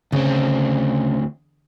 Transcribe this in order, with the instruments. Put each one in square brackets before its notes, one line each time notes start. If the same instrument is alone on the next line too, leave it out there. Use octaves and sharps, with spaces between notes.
[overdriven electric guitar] D2 C4 [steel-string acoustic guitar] C#3